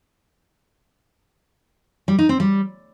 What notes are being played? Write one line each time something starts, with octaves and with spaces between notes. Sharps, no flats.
G3
D#4
C4
G3